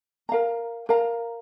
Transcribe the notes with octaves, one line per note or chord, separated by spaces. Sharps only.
A#4 F5 A#5
A#4 F5 A#5